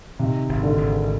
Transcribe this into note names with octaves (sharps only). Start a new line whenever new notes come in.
C3 D#3
G#1
D3
G#1